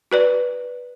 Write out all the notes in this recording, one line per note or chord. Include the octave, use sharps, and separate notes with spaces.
F#4 B4 D5